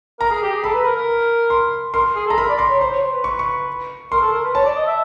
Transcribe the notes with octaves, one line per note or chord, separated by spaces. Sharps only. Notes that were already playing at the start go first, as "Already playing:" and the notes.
A#4 A#5
G#4
G4
G#4
A4 B5
B4
A#4
A#4
C6
A#4 C6
G#4
A4
A#5
A#4 B5
D5
C6
C#5
C5 C6
C#5
C5
B4
C#6
C#6
A#4 C6
A4
A#4
B4
C#5 A5
D5
D#5
E5